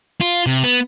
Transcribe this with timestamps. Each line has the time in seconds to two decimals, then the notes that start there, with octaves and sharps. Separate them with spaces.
0.21 F4
0.46 C3
0.64 B3